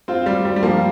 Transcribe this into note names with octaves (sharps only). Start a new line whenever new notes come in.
C4 F4
G3
G3
G3
F3 A#3